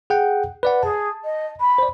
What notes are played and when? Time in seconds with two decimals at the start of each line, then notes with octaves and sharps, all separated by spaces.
0.10 G#4 F#5 G5
0.63 B4 D5 F#5
0.83 G#4 A5
1.24 D#5
1.60 B5
1.78 C5 D5